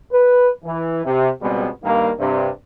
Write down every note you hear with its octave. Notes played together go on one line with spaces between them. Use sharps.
B4
E3
C3
C#2 B2 G3 G#3 B3 C4
G2 D#3 G3 A#3
G2 C3